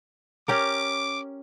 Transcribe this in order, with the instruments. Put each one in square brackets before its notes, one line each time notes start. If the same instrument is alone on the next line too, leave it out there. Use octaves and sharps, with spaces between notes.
[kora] C#4 G4 A#4 [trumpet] D6